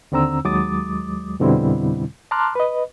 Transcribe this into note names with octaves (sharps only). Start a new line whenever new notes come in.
D#2 D3 C4 A#5 E6
D#2 F#3 G#3 D6 D#6 A6
F2 B2 D3 G3 C4 E4
A5 A#5 C6 D6 F6 F#6
B4 D#5